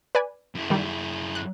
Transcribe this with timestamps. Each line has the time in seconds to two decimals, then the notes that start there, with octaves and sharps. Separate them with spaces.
0.15 B4 D5 G#5
0.55 F#2 E4
0.70 D#3 G3
1.35 F#6